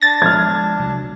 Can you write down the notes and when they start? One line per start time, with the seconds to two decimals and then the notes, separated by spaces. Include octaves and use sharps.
0.01 D4 A6 A#6
0.22 F3 G#3 F6 G#6
0.79 C2 F#3